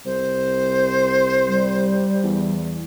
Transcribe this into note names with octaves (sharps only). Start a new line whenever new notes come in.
C2 C5
G3
E2